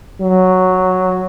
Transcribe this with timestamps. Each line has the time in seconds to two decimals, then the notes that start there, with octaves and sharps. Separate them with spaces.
0.21 F#3